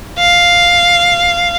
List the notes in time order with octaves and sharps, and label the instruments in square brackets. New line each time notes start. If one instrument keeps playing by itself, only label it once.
[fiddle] F5